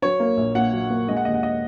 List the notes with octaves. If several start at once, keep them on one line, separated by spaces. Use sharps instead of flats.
F#3 C#5
A#3
A#1
A#2 F#5
F#3
A#3
G#3 D#5
F#5
D#2 D#5
F#5
D#5